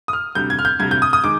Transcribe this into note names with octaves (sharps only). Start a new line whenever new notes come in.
D#6
F6
D2 C3 G3 G6
G#6
F6
G6
D2 C3 G3 G#6
G6
D#6
D#6
D#3 G#3 D6